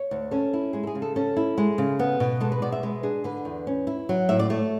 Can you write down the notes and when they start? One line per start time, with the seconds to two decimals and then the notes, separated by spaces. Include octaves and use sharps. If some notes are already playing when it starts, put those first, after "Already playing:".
Already playing: C#5
0.11 D2
0.31 C#4 A4
0.53 E4
0.73 G#3 G#4
0.83 A4
0.87 G#4
0.95 C#3
1.02 A4
1.16 C#4 A4
1.37 E4
1.58 G#3
1.78 C#3
1.99 B3
2.20 B2
2.41 G#3 A4
2.52 B4
2.62 B2 D5
2.72 E5
2.83 G#3 B4
3.03 D4 G#4
3.24 D3 B4
3.45 E2
3.67 C#4
3.87 E4
4.09 F#3
4.29 A2 E5
4.39 D5
4.50 A3 C#5